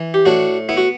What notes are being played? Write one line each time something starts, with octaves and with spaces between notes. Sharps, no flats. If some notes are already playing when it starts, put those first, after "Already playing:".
Already playing: E3
G4
A2 D4 F#4
B3 E4
F#4